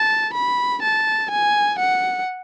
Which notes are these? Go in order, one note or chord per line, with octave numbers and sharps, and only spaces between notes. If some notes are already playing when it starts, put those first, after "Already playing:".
Already playing: A5
B5
A5
G#5
F#5